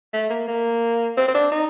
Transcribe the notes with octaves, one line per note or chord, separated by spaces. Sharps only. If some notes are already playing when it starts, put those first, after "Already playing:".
A3
A#3
A#3
C4
C4
D4
D#4